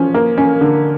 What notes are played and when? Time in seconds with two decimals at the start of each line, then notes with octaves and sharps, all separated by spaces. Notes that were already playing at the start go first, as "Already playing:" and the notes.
Already playing: F3 C#4
0.14 A#3
0.38 C#4
0.61 D3